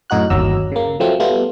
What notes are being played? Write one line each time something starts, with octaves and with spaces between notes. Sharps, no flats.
F#2 A2 D#4 F#4 F#6
G1 D#2 F#3 A#5 E6
C#3 A#3
F3 F#3 A3 C4
G3 A3 B3 F4